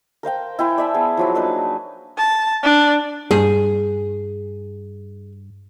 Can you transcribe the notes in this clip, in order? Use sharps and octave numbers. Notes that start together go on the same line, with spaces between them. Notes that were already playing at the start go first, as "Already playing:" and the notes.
A#4 C5 F5 G5
E4 G5 G#5 C6
D5 E5 A5
B3 G#4
F3 F#3 E4
A#3 D4 D#4 B4
A5
D4
G2 G#4